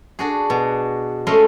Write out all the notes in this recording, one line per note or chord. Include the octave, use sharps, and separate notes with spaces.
D4 F#4 G#4
B2
G#3 A3 C#4 D#5 C6